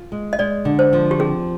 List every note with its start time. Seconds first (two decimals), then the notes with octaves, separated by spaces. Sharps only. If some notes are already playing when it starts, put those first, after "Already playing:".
Already playing: F4
0.12 G#3
0.33 D#5
0.39 G#3 D5
0.65 D3
0.79 C5
0.93 F3
1.11 G4
1.19 C4 G#4